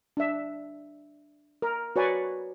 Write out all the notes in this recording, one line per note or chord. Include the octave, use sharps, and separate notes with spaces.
D4 E5
A#4
F#4 B4 C#5 D5 G#5